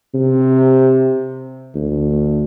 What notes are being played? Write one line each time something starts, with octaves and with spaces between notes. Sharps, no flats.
C3
D2